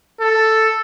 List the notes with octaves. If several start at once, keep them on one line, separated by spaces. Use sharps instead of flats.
A4